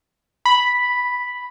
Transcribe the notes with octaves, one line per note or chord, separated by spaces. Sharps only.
B5